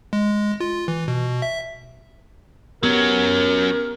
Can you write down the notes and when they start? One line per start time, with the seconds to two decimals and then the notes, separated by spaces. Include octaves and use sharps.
0.13 G#3
0.60 F4
0.88 E3
1.08 B2
1.42 E5
2.83 F#3 B3 C#4 G4 A#4